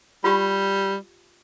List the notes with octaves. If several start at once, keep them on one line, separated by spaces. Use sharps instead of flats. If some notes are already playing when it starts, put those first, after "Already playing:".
G3 F4 G4